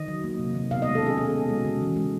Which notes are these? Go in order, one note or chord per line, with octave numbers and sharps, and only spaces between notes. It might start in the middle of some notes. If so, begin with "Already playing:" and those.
Already playing: D#3 D#5
F#3
A#3
C3
D#3
B2 F5
D#5
G#3
A4
C#4 G#4
B2 G#4
B2
G#3
C#3
E3
G#3